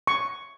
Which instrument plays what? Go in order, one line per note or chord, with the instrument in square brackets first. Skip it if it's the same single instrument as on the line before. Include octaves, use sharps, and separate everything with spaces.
[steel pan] C#6